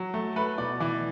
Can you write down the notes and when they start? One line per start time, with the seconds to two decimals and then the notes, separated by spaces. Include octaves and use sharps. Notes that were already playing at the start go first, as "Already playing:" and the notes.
Already playing: F#3
0.14 A3
0.36 A3 B4
0.58 B2 D5
0.80 E3 D5